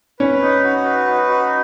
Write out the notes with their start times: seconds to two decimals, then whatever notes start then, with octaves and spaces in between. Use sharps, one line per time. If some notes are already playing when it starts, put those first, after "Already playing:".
0.19 C#4 B4
0.41 D#4
0.63 F#4
0.85 B4
1.07 D#4
1.29 F#4